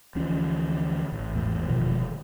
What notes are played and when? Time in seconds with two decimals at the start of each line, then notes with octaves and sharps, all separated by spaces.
0.15 D2 E3 F3 C#4
1.12 A1
1.35 G#1 E2 A2
1.68 F1 B2 D#3 F3